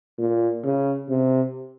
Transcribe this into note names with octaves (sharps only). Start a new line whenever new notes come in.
A#2
C#3
C3